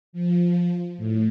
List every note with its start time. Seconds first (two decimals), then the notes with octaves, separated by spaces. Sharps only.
0.13 F3
0.98 A2